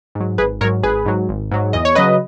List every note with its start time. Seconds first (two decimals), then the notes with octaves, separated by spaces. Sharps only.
0.15 G#2
0.20 F#3
0.38 G#1 G#4 B4
0.61 G#2 A#4 C#5
0.64 F#3
0.83 G#1 G#4 B4
1.06 G#2 F#3
1.29 G#1
1.51 G#2 F#3
1.73 E2 D#5
1.85 C#5
1.95 C#3 F#3 B4 D#5